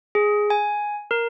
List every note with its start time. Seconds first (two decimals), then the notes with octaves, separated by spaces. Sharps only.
0.15 G#4
0.50 G#5
1.11 A#4